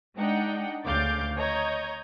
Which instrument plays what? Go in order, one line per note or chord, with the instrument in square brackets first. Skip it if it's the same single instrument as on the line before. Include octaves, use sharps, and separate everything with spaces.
[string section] G#3 D4 D#4 F#5 G5
D2 C#3 F5 D6 G6 A6
C#5 D#5 A#5 G6 G#6